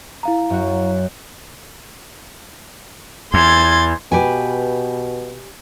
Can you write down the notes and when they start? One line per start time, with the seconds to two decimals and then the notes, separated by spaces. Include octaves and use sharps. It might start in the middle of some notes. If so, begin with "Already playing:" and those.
0.23 E4 F5 A#5
0.50 F#2 F#4
3.34 E2 C6 G#6 A6
4.12 B2 G4 B4 G#5